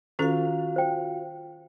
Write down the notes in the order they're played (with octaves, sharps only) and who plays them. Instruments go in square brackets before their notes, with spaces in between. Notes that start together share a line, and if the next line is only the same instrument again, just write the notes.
[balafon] D#3 C#4 A4 [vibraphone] F4 F#4 F5
[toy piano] C5 G5